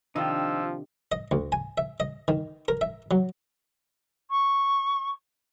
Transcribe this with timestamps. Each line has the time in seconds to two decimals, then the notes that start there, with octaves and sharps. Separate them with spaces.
0.16 C3 D#3 F3 D4 D#4 F4 E6
1.12 D#5
1.31 D2
1.52 G#5
1.78 E5
2.00 D#5
2.28 D#3
2.68 A#4
2.81 E5
3.11 F#3
4.30 C#6